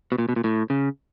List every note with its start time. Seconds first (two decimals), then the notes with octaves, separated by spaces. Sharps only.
0.12 B2
0.18 A#2
0.29 B2
0.36 A#2
0.44 A2
0.70 C#3